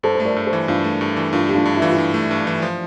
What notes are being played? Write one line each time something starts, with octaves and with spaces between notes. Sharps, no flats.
G2 A4 C5
A3 C5
A#4 D5
G2
A4 C5
E3
G2 D4 F4
A3
G2
E3
G2 D4 F4
A3 G4
D4 F4
G2
E4
E3 F4
E4
G2
A3
G2
E3
F3